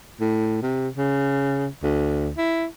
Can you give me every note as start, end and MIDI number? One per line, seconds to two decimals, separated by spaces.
0.20 0.61 45
0.63 0.88 48
0.97 1.67 49
1.83 2.31 38
2.37 2.65 64